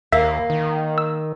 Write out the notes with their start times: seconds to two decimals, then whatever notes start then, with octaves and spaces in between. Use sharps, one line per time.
0.12 D#2 A#3 E5
0.50 D#3
0.98 E6